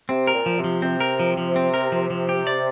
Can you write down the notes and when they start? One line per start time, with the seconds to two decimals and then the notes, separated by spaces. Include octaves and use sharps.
0.09 C3 C4
0.27 A#4
0.33 A#2
0.46 F3
0.58 C3
0.64 F3
0.82 C3 C4
1.00 A#4
1.20 F3
1.37 F3
1.56 C4
1.74 A#4
1.92 F3
2.10 F3
2.29 G4
2.47 D5